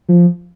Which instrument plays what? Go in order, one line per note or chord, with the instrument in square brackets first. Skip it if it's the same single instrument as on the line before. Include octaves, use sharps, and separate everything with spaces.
[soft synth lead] F3